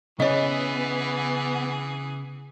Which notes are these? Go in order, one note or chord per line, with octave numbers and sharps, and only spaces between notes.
C#3 E3 B3 G#4 C#5 D#5